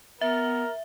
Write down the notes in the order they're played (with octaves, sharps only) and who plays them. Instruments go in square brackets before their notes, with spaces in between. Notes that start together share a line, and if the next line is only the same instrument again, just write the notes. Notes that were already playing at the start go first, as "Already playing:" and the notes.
[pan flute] B3 [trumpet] A#4 [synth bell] E5